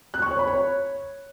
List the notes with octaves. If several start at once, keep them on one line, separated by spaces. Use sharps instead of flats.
F#6
C#6
C#5
B5
C#5